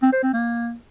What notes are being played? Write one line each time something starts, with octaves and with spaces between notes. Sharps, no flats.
C4
C5
C4
A#3